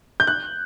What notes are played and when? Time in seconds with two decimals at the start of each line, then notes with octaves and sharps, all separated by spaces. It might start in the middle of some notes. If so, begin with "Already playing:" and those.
0.20 G6
0.27 F#6